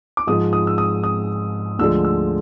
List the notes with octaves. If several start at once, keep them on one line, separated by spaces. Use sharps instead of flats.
D6
G#2 F3 G#3 D#6
D#6
E6
D#6
D#6
D2 D3 F3 G#3 E6
E6